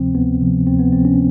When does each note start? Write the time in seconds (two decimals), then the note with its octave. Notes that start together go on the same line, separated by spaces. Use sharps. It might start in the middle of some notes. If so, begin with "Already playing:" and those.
Already playing: D2 C3 F3 C4
0.15 D2 B3
0.41 C3 F3
0.67 D2 C4
0.79 B3
0.92 C3 F3 C4
1.05 C#4